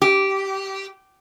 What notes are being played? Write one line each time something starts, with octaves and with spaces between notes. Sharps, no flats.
G4